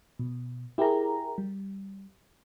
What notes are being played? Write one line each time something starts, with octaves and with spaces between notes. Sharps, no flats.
B2
E4 G4 G#4 A#4 A#5
G3